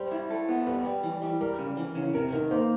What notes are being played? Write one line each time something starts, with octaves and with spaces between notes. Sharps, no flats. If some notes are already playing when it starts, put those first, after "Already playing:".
Already playing: G3 C5
E4
A4
B3
G3 B4
G3
E3
G3
G3 A#4
C#3
E3
C#3
C3 A#4
D#3 A#4
A#3 C5